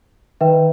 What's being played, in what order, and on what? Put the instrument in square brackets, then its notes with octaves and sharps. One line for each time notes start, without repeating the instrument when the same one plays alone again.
[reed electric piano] D#3 [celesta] B4 E5 G5